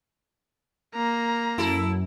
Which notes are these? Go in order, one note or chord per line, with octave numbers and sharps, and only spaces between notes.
A#3 A#5
F#2 E4 A4